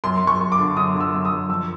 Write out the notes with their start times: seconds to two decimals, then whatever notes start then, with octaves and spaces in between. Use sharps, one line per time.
0.04 F#2 C6
0.22 F#2
0.27 C#6
0.40 F#2
0.52 D6
0.58 D3
0.77 F#2 D#6
0.94 D3
1.00 E6
1.13 F#2
1.25 D#6
1.31 F#2
1.49 F2 E6